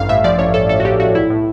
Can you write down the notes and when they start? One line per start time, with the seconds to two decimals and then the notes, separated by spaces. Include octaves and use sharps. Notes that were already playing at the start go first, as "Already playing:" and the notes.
Already playing: A1 G2 F5
0.09 A2 E5
0.24 F3 D5
0.39 A1 C#5
0.54 A1 A4
0.69 A1 A4
0.80 F#4
0.85 A1 G4
0.99 A1 F#4
1.15 B1 E4
1.30 A2